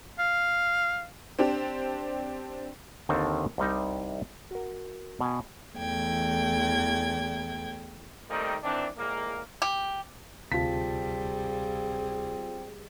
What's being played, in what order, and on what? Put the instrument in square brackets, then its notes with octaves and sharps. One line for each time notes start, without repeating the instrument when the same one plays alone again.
[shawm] F5
[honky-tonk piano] C4 D4 G4
[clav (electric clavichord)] D#2 D3 D#3 C4 A4 A5
C2 C3 G3 D#4
F#4 A#4
B2 G#5
[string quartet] E2 E3 A3 G5 G#6
[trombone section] D#3 G3 A3 A#3 C4 D#4
D#3 E3 C4 D4
A#1 A2 G#3 A#3
[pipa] G4
[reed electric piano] D2 C3 A5 [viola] G3 G#4 [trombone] C4 [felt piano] F4 B6